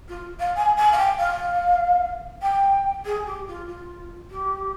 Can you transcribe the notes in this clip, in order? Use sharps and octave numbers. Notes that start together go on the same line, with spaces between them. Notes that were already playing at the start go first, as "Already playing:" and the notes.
F4
F5
G#5
G#5
F5
G5
F5
G5
G#4
G4
F4
F4
G4